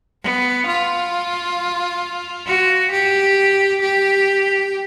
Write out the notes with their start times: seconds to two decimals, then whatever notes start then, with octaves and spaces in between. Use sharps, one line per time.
0.23 B3
0.67 F4
2.47 F#4
2.92 G4
3.82 G4